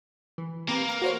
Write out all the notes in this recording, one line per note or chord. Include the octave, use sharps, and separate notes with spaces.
E3
A#3 C4 G4 B4
A#5
F#4 C5 C#5